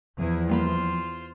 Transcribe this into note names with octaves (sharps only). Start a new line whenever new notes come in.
E2 F3 E4 G#4
G3 A#3 F4 C5 B5